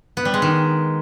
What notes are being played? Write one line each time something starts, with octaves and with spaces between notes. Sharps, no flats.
B3
G3
G#3
D#3